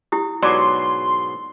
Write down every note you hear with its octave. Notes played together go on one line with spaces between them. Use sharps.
E4 G4 D#6
G#2 B2 F#3 D5 C6 D6